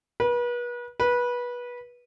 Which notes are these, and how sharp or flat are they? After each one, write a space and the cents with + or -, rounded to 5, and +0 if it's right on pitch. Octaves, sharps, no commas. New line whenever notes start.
B4 -35
B4 -20